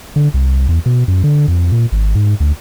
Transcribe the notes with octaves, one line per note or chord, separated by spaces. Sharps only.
D3
C2
E2
B2
F#2
D3
F2
A#2
G#1
G#2
D2